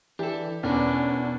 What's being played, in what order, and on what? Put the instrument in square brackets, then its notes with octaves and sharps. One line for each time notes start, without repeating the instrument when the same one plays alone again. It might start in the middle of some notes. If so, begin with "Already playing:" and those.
[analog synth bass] E3 [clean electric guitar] D4 A4 [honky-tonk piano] G4
[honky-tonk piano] E2 [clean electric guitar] B2 A#4 B4 [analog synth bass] C#4 [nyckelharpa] D4